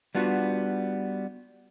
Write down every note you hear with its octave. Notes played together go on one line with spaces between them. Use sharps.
G3 B3 D4 F4 F#4